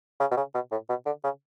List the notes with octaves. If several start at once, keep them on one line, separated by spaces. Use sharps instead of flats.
C#3
B2
C#3
B2
A2
B2
D3
C#3